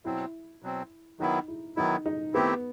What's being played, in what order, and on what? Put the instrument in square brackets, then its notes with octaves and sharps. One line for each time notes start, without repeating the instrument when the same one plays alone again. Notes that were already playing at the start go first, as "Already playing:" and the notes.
[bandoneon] B2 F#3 C4 [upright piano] E4
[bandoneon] B2 F#3 C4
[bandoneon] D#3 F#3 B3 E4 [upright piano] D#4
[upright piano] E4
[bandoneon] D#3 F#3 B3 E4 [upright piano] D#4
[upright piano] D#4
[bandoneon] D#3 A3 C4 E4 G4 [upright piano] B3